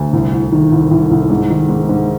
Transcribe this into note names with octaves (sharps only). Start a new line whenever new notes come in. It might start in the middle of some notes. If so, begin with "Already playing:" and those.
Already playing: D2
C2
C2
D#3
C2
C2
C2
G#2
D#3
G#2
G#2